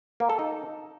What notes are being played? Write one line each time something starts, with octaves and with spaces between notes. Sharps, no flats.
A#3
A4
D#4